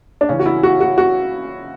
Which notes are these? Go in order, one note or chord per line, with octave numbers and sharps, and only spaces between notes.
D4
C#3 E3 C#4
F#4
E4
F#4
F#4
F#4